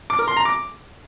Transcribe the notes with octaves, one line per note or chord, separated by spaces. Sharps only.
D6
A#4
C6
A#5
D6